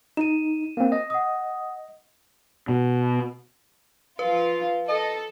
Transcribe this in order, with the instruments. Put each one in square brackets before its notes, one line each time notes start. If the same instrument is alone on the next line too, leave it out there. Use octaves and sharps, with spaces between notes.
[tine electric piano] D#4 [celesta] D#7 E7
[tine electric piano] A#3 C4
D#5
[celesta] F#5 D#6
[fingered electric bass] B2
[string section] F3 F4 [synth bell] B4
[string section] A4 [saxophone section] D#5